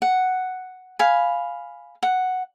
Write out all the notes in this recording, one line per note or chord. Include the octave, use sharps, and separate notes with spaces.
F#5
F5 G#5 B5
F#5